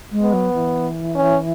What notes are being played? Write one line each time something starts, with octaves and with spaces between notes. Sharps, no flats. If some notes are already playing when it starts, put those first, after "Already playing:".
G#3
B3
F#3
E3
C#4